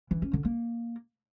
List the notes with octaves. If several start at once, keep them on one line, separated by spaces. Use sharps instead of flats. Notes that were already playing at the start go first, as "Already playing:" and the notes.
E3
C#4
D3
A#3